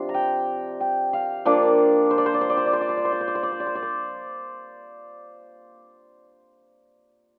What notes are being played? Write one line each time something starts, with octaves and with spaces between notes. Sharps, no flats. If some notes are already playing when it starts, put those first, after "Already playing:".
Already playing: C3 F3 D4 C6
A#5
G5
G5
F5
F3 A#3 D4 D5
C5
D5
C5
D5
C5
D5
C5
D5
C5
D5
C5
D5
C5
D5
C5
D5
C5
D5
C5
D5
C5
D5
C5